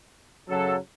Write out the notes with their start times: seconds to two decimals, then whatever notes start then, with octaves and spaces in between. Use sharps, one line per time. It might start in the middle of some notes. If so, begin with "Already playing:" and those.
0.48 F#2 C#3 F#3 A4